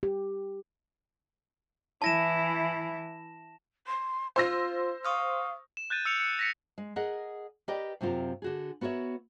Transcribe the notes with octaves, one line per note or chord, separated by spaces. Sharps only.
G4
E3 E4 A5 A#6 E7
C6
F4 C5 E6 A#6
F5 C#6 D#6 F6
E7
F#6 G6 A6 D#7 E7
E6 C#7 F7
C#7
A#6 B6 C#7
G#3
G#4 A#4 D#5 F#5
G4 A#4 B4 D5 D#5 G5
F#2 C3 C4 F4 A#4
D3 F#4 G#4
B3 F#4 A#4 C#5 E5